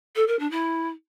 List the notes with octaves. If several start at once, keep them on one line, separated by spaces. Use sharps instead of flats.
A4
A#4
D4
E4